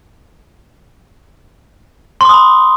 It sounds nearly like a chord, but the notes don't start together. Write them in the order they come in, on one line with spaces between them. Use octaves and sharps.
C6 D6 D#6 B5